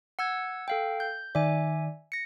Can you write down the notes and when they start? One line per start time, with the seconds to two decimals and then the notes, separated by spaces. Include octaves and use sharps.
0.19 F#5 E6 G#6
0.68 A4 F5 G5
1.00 G6
1.35 D#3 D5 E5 G#5
2.12 A#6 C#7